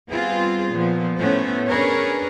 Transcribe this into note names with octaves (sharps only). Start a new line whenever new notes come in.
G3 B3 C4 F4 G#4
A#2 F3 B3
A2 A3 B3 C#4 A4 C5
C#4 D4 G#4 A#4 B4 C#5